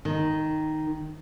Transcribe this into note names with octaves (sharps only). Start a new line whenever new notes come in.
D#3